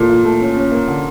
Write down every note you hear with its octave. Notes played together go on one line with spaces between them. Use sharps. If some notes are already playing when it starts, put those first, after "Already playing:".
Already playing: A#2 E3 A4
F4
A3
C#4
C#4
A#3
D3